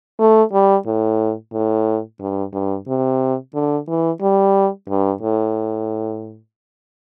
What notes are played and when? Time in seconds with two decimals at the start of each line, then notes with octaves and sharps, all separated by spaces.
0.19 A3
0.53 G3
0.86 A2
1.53 A2
2.20 G2
2.53 G2
2.88 C3
3.54 D3
3.87 E3
4.21 G3
4.88 G2
5.22 A2